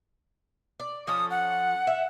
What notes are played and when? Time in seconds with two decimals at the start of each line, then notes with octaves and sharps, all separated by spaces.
0.80 D5
1.07 F3 C#4 A4 D#6
1.30 F#5
1.87 E5